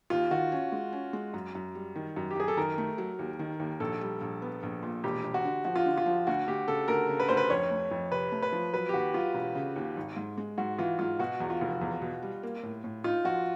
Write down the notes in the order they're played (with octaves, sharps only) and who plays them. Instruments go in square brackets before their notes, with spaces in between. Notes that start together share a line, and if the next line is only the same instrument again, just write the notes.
[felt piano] D#2 [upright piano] F4
[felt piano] D#3 [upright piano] F#4
[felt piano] C#4
G#3
C#4
G#3
F#2
F#2
G3
D#3
F#2
[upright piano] G4
[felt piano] F#2 [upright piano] G#4
[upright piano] A4
[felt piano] D#3 [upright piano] A#4
[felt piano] A3
F#3
D#2
D#3
D#2
[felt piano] A#1 [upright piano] A4
[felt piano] G3
A#1
B3
A#1
A#2
[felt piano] E1 [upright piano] G4
[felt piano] E1
[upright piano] F#4
[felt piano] D3
[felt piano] F3 [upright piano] F#4
[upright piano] F4
[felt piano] D3
[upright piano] F4
[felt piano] F3
[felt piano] D2 [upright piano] F#4
[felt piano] D2 [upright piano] G4
[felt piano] C#3 [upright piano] A4
[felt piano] D2 [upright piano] A#4
[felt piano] C#3
[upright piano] B4
[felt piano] D2 [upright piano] C5
[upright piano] B4
[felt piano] F2 [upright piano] C#5
[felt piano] A3
F2
[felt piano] C3 [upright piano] B4
[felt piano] A3
[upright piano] B4
[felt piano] F3
[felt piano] F#3 [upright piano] B4
[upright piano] G4
[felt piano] D#2 [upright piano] F#4
[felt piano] F#3 [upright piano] F4
[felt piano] E1
C#3
D#2
G#1
G#2
G#3
[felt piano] G#2 [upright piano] F#4
[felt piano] E3 [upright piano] F4
[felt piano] G#2 [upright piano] F4
[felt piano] B2 [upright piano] F#4
[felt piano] E2
[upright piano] F4
[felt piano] F1
E2
B2
G3
A#3
A2
A2
[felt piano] D#4 [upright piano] F4
[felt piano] F3 [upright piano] F#4